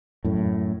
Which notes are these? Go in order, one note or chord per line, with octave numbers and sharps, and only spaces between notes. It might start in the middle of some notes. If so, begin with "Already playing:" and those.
F#2 A2